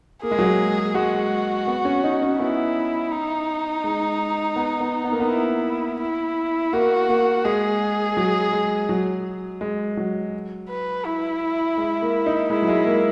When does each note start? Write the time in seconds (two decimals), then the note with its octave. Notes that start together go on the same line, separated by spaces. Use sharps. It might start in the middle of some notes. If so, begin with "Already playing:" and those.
0.23 A#3 G#4
0.31 G#3
0.39 F#3
0.46 G#3
0.95 G#3 F#4
1.67 B3
1.85 C#4
2.04 D#4
2.22 C#4
2.40 B3 E4
3.11 D#4
3.84 G#3
4.56 B3
4.80 B3
5.04 B3
5.12 A#3
5.20 B3
5.28 E4
6.00 E4
6.73 A#3 F#4
7.09 A#3
7.45 G#3 G#4
8.17 F#3
8.53 G#3
8.89 F#3
9.61 G#3
9.97 F#3
10.70 B4
11.06 E4
11.78 G#3
12.02 A#3
12.26 D#4
12.50 G#3 E4
12.62 F#3
12.68 G#3
12.86 A#3